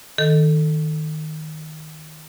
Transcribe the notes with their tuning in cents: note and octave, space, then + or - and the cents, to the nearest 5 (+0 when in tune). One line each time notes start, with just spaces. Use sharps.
D#3 +0 A4 +5